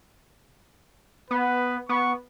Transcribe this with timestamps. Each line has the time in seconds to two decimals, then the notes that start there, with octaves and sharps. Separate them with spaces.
1.31 B3 B4
1.89 B3 C#6